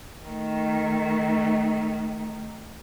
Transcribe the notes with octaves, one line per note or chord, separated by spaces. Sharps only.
D#3 A3